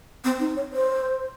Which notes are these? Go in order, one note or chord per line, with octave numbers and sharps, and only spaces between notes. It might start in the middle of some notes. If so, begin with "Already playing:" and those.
C4
D#4
C#5
C5